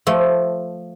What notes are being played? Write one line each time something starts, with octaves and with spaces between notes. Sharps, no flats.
F3 A3